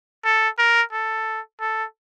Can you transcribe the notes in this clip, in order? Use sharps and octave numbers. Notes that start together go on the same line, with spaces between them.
A4
A#4
A4
A4